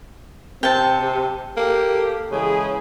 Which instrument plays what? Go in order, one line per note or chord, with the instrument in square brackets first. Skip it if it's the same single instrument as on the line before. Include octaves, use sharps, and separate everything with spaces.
[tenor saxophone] C3 [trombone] C4 [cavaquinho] G5 A5
[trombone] G4
[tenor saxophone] A#3 [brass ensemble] G4 [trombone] A4
[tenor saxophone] C#3 [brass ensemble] E3 G#3 G#4